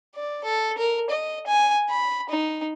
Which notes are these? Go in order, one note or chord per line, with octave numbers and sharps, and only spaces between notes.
D5
A4
A#4
D#5
G#5
B5
D#4